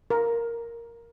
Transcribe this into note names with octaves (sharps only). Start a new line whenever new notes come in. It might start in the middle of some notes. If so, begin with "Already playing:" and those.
A#4